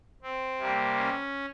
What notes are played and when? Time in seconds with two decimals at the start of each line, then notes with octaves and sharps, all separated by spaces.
0.22 C4
0.58 C3 G3 A#3
0.95 C#4